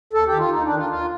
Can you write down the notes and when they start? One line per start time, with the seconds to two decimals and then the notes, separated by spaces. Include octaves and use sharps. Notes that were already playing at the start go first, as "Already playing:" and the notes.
0.13 D#2 A4
0.26 G4
0.32 D#3
0.39 F4
0.51 D#2 D#4
0.64 D4
0.70 D#3
0.76 F4
0.89 D#2 F4